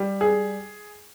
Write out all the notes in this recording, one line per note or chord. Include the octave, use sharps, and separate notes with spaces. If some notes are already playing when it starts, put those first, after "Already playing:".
Already playing: G3
G#4